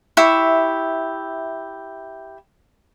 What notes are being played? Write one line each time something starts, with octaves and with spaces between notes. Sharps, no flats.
E4 G4 E5 C#6